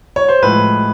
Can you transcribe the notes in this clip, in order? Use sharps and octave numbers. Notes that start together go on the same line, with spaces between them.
C#5
C5
A2 F3 G#3 B4